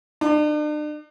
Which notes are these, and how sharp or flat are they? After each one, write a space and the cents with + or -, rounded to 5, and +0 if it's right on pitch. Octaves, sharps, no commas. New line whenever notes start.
D4 +40